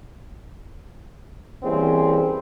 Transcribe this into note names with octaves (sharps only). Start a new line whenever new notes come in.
E3 G3 A#3 C4 C#4 G#4